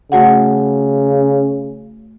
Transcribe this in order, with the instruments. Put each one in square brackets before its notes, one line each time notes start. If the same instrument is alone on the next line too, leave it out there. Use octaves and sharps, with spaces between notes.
[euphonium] C#3 [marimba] A3 F#4 F#5